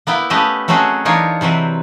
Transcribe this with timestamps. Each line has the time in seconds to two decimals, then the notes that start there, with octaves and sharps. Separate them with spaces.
0.07 A#3 B3 E4 G5
0.30 A3 B3 C#4 G4 D#5 E5
0.68 F#3 A3 C4 C#4 F#4 G#4
1.05 E3 D4 D#4 F4 A#4 C#5
1.41 C3 E3 F#3 C4